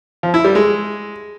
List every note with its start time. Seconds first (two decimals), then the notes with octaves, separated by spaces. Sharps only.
0.23 F3
0.34 E4
0.45 G3
0.55 G#3